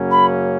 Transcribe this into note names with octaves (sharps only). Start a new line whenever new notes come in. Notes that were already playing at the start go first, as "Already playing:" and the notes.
Already playing: F#2 C#3 F#3 A#3 C#4
B5